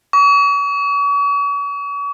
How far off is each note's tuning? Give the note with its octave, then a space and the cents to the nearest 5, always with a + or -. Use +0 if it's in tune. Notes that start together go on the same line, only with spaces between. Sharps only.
C#6 +40